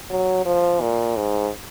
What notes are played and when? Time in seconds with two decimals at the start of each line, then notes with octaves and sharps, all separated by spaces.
0.10 F#3
0.46 F3
0.81 A#2
1.17 G#2